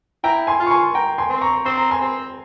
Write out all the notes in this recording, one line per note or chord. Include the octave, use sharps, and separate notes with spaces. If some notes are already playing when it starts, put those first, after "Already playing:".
E4 G5 A#5
G#5 C6
F4
C#6
G#5 C6
G5 A#5
G#5 C6
C4
A#5 C#6
C4 C6
A#5
G#5 C6
C4